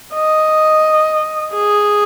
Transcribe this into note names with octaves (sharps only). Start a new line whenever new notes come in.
D#5
G#4